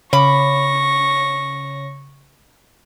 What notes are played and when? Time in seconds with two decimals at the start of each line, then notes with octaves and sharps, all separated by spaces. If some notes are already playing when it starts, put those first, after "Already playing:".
0.13 C#3 B5 C#6 D6 A#6